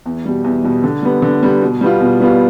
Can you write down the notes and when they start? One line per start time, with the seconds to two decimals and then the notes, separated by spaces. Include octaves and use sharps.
0.06 E2
0.26 B2 G3
0.44 E2
0.64 B2 G3
0.84 D3
1.02 G3 B3
1.22 D3
1.43 G3 B3
1.62 B2
1.81 G3 B3 F4
2.01 B2
2.20 G3 B3 F4